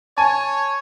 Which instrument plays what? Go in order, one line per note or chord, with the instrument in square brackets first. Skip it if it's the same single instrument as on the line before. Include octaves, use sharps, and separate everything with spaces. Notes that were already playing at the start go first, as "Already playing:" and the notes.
[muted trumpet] C#5 [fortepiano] G#5 [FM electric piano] A5